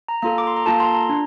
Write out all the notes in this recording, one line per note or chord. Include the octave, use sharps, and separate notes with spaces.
A#5
A#3 F4 A4 A#5
D6
C6
A#5
A#3 F4 A4 A5
C6
A#5
D4